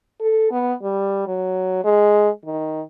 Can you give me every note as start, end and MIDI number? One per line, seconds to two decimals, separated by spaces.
0.20 0.50 69
0.51 0.73 59
0.82 1.23 55
1.26 1.82 54
1.84 2.29 56
2.45 2.81 51